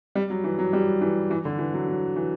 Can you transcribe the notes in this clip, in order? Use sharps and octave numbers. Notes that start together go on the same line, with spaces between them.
G3
F#3
E3
F#3
G3
E3
E3
D3
E3
F#3
F#3
E3